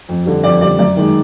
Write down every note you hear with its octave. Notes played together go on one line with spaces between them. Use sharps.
F2
D3 G3
F2 D5
D3 G3 D5
F#2 D5
D#3 G#3